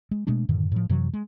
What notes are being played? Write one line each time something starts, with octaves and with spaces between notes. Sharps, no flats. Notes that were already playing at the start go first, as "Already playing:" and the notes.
G#3
B2 G#3 A3 D4
F#2 A2 D3 D#3
A2 F3
F#2 C3 E3 F#3
G#3